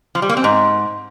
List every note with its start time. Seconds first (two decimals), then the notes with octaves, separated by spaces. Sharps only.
0.15 F3
0.22 G3
0.29 A#3
0.37 C4
0.44 G#2